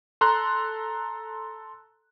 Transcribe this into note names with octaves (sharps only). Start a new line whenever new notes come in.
A4 A#5 C6 F#6